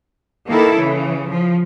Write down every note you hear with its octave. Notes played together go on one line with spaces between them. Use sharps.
D#3 A#3 E4 A4
C#3 E3
F3